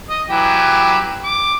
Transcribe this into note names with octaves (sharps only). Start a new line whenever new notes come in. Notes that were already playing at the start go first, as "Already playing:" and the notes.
D#5
E3 F#3 G4
D6